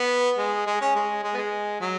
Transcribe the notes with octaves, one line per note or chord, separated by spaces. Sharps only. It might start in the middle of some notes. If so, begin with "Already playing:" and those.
Already playing: B3
G#3
G#3
C#4
G#3
G#3
B3
G#3
F#3